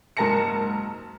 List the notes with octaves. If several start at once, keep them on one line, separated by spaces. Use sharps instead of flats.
F#1 G#2 A#4 A5 A#6 C#7